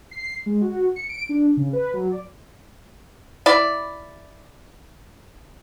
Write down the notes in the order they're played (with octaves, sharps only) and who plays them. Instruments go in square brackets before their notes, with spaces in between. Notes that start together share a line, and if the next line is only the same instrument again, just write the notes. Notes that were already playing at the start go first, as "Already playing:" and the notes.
[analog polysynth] C7
G#3
F#4
C#7
D7
D4
C#3
B4
F#3
D5
[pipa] E4 D5